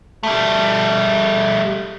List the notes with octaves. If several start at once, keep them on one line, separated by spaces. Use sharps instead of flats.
G3 A3